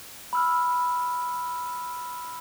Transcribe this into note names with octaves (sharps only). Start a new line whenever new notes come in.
B5 E6 F6